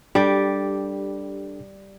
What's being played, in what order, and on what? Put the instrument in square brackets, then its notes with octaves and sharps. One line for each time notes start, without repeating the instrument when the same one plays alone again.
[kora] G3 D5 [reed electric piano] D4 G4 A4